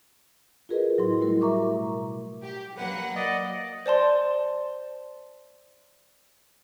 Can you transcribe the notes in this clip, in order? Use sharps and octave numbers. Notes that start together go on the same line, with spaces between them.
F4 F#4 G#4 A#4 B4 D#5
A2 F#3 E4 C6
G3 A3 E4 F#4 A#4
G4 A#4 E5 A#5 C#6 D6
B2
G4
F#3 A#3 B4 F#5
D5 D#5
C5 D5 A5 C6